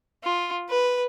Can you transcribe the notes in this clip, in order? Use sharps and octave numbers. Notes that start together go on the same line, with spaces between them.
F4
B4